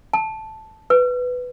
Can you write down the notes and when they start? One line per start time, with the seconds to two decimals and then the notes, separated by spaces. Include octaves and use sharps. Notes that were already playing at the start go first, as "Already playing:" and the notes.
0.13 A5
0.90 B4